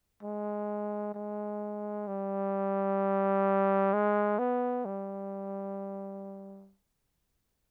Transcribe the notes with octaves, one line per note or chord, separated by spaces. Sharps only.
G#3
G#3
G3
G#3
B3
G3